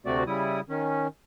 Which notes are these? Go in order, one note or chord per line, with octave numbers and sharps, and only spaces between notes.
D2 C3 A3 C4 F#4 D5
C#3 G3 E4 D#6
D#3 C#4